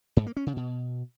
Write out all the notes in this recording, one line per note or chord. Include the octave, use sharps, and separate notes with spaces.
G#2
A#3
C#4
C#3
B2